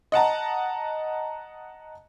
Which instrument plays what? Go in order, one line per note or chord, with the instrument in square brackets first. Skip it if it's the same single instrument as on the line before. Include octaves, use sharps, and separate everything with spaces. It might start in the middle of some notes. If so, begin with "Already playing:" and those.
[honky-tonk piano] D#5 F#5 A5 A#5